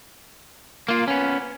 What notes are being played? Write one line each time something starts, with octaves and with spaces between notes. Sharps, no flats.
A#3 F4
B3 C#4